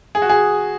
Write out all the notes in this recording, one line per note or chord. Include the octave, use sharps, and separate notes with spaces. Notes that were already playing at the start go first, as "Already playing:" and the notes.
G#4
F#4
G#4